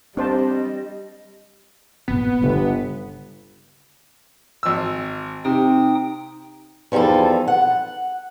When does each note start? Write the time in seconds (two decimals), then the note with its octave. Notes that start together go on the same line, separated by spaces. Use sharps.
0.17 G3 C4 D4 C5 D#5 A5
2.08 A#2 B3 C#4
2.42 G1 C#3 G3
4.63 G#1 E6
5.45 C3 D#4 G5 D#6
6.92 E2 F3 G3 D#4 A4
7.48 F#5